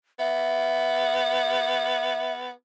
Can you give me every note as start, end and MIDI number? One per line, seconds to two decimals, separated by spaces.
0.19 2.50 59
0.19 2.33 76